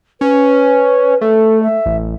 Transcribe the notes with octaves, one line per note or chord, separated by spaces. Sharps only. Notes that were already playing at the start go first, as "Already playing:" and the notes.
C#4 B4
A3 A4
E5
A1